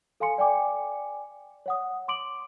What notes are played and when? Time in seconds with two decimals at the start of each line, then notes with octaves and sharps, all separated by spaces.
0.20 A4 F5 G#5 C6 C#7
0.38 D5 G5 G#5 D6
1.66 C#5 F#5 D#6
2.08 C6 D6 D7 F#7